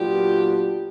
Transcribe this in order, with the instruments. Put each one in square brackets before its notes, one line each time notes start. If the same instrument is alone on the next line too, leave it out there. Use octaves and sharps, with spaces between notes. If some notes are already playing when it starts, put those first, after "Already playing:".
Already playing: [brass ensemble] A#2 F#3 B3 D4 F4 [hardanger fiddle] G4